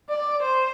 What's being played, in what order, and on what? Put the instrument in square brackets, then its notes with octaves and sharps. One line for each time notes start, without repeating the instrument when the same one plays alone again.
[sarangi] D5
C5